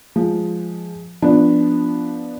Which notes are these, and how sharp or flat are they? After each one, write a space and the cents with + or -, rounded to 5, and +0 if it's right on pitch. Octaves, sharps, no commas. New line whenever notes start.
F3 +0 G#3 +0
F3 -5 B3 +0 D4 +0